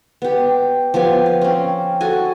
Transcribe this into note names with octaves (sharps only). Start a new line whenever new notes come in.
B3 G4
F3 B3 G4 G#5
F5
C4 C#4
F#4 A4 G#5